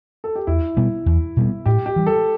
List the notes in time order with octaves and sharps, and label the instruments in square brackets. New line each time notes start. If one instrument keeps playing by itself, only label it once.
[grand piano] A4
G4
[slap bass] E2 [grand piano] E4
[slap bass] B2 G3 B3
E2
B2 G3 B3
[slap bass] A2 [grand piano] G4
[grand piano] G4
[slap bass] E3 G3
[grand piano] A4